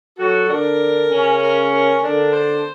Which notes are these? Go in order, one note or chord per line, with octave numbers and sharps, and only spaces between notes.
F#3 F#4 A4
D3 D4 A#4
C#3 C#4
A#4
A#4
D3 D4 A#4
C5